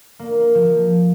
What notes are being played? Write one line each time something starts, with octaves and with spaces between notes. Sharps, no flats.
A#3
F3